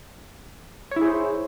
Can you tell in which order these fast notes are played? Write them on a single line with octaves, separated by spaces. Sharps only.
C#5 E4 G#4 C5